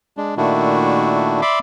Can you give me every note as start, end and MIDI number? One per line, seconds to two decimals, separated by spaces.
0.17 0.35 56
0.17 0.35 62
0.37 1.41 46
0.37 1.41 51
0.37 1.41 57
0.37 1.41 62
0.37 1.41 64
0.37 1.41 66
1.42 1.59 74
1.42 1.59 76
1.42 1.59 83
1.42 1.59 84
1.42 1.59 86